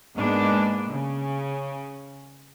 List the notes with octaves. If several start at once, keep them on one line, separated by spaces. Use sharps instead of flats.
G#2 G#3 A#3 B3 D4
C#3